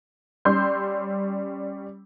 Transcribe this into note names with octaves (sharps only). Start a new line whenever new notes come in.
G3 C#4 C6 E6 G6